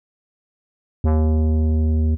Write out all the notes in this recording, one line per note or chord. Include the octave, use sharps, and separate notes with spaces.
D#2